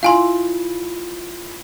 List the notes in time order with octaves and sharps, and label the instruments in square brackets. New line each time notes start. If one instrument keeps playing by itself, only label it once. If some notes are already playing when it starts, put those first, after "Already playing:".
[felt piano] E4 F4 [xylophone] F5 G#5 C6